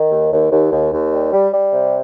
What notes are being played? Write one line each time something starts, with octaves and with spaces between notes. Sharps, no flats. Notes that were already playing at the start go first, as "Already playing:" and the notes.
Already playing: D#3
D#2
D#2
D#2
D#2
D#2
G3
G3
G3
C3